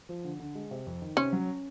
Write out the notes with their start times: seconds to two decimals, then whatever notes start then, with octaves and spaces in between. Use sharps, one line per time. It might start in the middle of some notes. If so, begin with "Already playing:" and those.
0.09 F3
0.24 D3
0.40 D3
0.55 G#3
0.71 C3
0.86 F2
1.02 D#3
1.17 C3 C#4
1.33 F#3